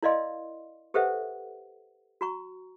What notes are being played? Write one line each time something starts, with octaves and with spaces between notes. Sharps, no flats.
E4 A#4 D5 D#5 F5 C6
G4 A4 B4 C5 E5 F#5
F#4 A#5 C#6